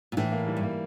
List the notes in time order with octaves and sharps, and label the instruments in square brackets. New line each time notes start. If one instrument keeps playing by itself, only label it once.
[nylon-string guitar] A#2
[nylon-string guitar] A2 [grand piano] E3
[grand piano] A#3
G3
[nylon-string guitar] G2
[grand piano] A#3